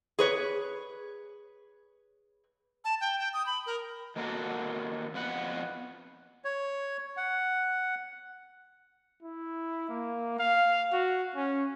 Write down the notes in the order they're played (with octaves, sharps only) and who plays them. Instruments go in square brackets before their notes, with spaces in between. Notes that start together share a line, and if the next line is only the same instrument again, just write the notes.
[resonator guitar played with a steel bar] G#4 B4 C#5
[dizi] A5
G5
G5
D#6
B5
A#4
[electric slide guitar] D#3 A#3 B3 F#4 A4
F2 B3 F#5
[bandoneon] C#5
F#5
[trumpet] E4
A#3
F5
F#4
C#4